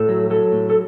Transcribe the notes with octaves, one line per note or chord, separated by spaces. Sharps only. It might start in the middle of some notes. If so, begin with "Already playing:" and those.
Already playing: A2 A4
F#3
F#3 A4
A2
A4